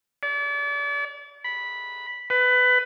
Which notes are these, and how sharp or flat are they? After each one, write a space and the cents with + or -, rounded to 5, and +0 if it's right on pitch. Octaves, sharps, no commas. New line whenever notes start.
D5 -35
B5 -5
B4 +20